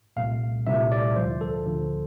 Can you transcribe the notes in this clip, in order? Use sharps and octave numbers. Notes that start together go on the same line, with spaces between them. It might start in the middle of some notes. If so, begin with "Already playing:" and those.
C2 A#2 A3 F5
C2 A#2 A3 E5
D5
D2 D3 F3 C5
A4
D2 D3 F3